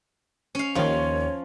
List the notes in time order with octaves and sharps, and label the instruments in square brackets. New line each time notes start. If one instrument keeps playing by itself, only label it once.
[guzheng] C#4 F5
[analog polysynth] D#2 D#3 [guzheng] F3 F4 [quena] C#5